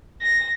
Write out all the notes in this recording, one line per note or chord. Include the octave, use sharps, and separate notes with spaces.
A#6